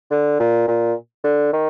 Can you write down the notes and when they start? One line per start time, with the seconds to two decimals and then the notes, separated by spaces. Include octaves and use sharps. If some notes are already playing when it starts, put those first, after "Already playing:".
0.11 D3
0.40 A#2
0.68 A#2
1.24 D3
1.53 D#3